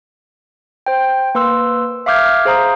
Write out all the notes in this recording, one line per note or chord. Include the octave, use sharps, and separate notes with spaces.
C5 G5
A#3 B4 C6 E6
E5 F5 D6 F6 G6 G#6
G#4 C5 F5 A#5 D#6